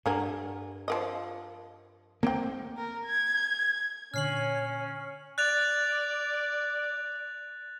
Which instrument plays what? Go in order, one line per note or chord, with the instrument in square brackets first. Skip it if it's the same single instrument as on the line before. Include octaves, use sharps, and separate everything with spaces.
[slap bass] G2 [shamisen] D3 A#4 G#5
[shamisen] F3 A#4 D#5
[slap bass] A#3 C4 [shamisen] A#4 G5
[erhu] A#4
G#6
[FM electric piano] A#2 D3 [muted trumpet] C#4 [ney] C#5 [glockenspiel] F6 C7 F#7
[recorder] D5 [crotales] F#6 A6 F7